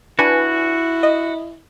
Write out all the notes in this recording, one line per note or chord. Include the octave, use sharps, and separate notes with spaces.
D4 E4 F#4 B4 G#5
D#5